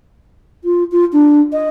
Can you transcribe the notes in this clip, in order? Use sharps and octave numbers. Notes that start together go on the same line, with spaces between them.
F4
F4
D4
D#5